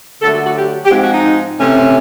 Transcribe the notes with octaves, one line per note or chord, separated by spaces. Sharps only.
D3 F#3 A3 A4
F#4
F#4
G4
G4
G#2 F3 G#3 C4 F#4
F#4
D#4
C3 E3 A3 C#4